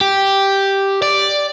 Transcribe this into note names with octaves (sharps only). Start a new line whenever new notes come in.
G4
D5